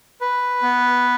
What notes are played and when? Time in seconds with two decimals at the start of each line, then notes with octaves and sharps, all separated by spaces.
0.21 B4
0.63 B3